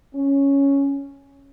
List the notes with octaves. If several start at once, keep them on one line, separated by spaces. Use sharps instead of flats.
C#4